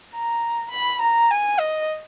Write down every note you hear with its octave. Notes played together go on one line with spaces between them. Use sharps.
A#5
B5
A#5
G#5
D#5